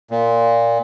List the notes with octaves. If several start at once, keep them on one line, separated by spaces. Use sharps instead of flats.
A#2